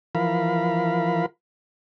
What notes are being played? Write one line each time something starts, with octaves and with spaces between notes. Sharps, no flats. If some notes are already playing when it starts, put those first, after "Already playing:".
E3 F3 A#4 F5 B5